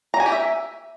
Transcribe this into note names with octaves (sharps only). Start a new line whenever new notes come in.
A#5
G#5
G4
E5